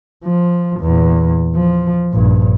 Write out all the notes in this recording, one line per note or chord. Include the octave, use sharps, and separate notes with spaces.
F3
E2 A#2
F3
A#1 G2